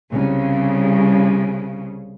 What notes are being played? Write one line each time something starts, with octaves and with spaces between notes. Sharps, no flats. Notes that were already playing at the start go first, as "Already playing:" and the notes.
C2 C#3